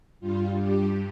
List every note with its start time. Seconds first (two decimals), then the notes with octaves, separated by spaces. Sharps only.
0.20 G2 G3 F4
0.58 G4